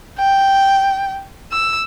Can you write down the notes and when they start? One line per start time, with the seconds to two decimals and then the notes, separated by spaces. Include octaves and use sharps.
0.19 G5
1.52 E6